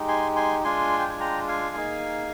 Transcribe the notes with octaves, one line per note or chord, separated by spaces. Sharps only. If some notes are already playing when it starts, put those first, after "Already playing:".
Already playing: G#3 D#4 G4
G#5 C6
G#5 C6
G#3 D4 F4 G#5 C6
G5
G#5
G5 A#5
F5 G#5
A#3 D#4 G#4